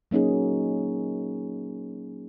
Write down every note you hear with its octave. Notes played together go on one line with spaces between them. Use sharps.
F#3 A#3 C#4 D#4 G#4